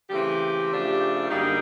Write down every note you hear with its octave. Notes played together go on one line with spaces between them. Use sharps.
C#3 E3 A3 C4 G4
C#3 F3 A3 D4
F#2 D3 G3 A#3 D#4 G#4